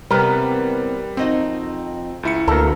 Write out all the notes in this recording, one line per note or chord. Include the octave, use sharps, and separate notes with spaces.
C3 E3 G3 B3 A#4 B4
F2 C4 D#4 F#4
C#2 E4 C#7
D2 A#3 B3 A4 A#4